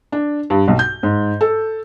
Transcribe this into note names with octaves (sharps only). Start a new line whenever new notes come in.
D4
G2
B1
G6
G#2
A4